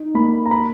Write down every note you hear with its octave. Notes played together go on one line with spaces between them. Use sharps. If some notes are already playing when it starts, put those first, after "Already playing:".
Already playing: D#4
A#3 B5
A#5
B5